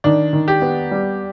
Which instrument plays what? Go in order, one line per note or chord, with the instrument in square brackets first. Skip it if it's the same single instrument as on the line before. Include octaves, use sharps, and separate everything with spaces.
[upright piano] D#3 [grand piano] D4
[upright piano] D#3
[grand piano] G4
[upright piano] B3
G3